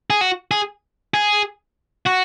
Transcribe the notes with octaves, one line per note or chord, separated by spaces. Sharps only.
G#4
F#4
G#4
G#4
F#4